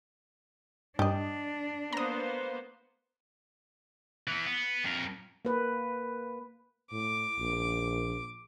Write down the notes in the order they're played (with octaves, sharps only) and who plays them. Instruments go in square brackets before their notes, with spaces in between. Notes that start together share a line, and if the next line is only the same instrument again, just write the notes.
[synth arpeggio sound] G2 [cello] D4 [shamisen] G4 D#5
[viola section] A#3 B3 C5 [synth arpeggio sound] A#5 D#6
[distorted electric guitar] E3 B3
B3
F2 A#4
[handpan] A#3 B4
[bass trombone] A2 [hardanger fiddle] D6
[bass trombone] A#1